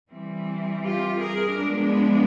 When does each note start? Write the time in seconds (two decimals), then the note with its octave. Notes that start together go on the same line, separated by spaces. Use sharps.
0.11 E3 G3 C4
0.84 F4 G4
1.21 G#4 A#4
1.58 F3 G#3 B3 D4